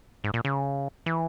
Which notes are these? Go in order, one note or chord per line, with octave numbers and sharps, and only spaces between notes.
G#2
A#2
C#3
E3